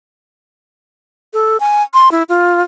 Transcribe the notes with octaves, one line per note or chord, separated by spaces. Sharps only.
A4
G#5
C6
E4
F4